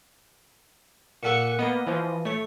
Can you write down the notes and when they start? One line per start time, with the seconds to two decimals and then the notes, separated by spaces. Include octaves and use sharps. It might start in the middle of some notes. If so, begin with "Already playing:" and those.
1.23 A#2 A4 F#5 C#6 C#7
1.59 A#3 B3 D#5
1.87 E3 F3
2.25 A3 C#5